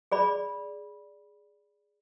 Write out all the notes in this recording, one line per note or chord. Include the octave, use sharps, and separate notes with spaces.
G#4 D5 B5